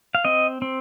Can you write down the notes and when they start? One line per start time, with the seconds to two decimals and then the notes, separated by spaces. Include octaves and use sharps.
0.15 F5
0.25 C4 D#5
0.62 C4